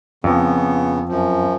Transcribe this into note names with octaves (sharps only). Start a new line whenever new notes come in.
F2 C#3 B3
F#2 F3